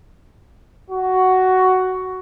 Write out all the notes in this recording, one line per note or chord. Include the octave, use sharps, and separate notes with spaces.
F#4